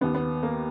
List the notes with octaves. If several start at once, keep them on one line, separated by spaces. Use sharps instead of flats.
D#2 D#3 B3
B3
A#3